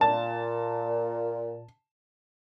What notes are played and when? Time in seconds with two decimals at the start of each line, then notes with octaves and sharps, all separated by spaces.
0.01 A#2 A5